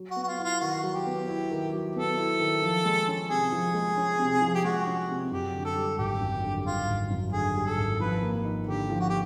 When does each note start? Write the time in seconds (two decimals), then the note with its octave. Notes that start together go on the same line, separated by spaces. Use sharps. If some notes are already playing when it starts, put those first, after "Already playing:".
Already playing: F#3
0.11 F#4
0.16 B3
0.23 F#4
0.28 F4
0.38 E4
0.45 F4
0.61 D#3 F#4
0.83 F#3
0.95 G4
1.06 B3
1.28 E4
1.51 D#3
1.73 F#3
1.96 B3 A4
2.18 E4
2.40 D#3
2.62 F3
2.85 G#3
3.08 C#4
3.29 C3 G#4
3.52 F3
3.74 G#3
3.97 C#4
4.19 C3
4.42 F3
4.55 G4
4.64 G#3 F#4
4.86 C#4
5.09 C3
5.31 F#2 G4
5.54 D3
5.65 A4
5.76 G3
5.98 G#1 G4
6.21 F#2
6.43 D3
6.66 G3 F4
6.88 G#1
7.10 F#2
7.33 D3 G#4
7.55 G3
7.67 A4
7.77 G#1
8.00 F3 B4
8.22 A#3
8.45 D#4
8.67 D3 G4
8.90 F3
9.00 F#4
9.10 G4